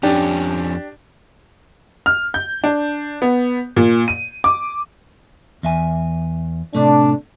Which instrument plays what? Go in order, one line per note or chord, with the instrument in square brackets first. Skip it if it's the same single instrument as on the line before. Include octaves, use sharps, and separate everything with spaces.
[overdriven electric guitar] F2 C#4 [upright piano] D4 G4
[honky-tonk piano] F6
G6
D4
B3
A#2
D#7
D6
[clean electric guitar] E2 E5 G#5
[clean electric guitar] A2 C3 A3 [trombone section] D4